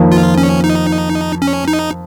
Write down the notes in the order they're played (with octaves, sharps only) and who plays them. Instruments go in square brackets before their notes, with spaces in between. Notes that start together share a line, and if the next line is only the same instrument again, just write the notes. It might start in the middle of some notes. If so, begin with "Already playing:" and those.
Already playing: [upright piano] F2 D#3 A#3
[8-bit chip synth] F4
C#4
D#4
C#4
D#4